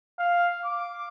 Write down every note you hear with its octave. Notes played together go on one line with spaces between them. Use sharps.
F5
D6